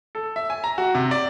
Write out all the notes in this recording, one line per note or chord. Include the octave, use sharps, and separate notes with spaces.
A4
E5
G#5
A#5
F#4
C3
D5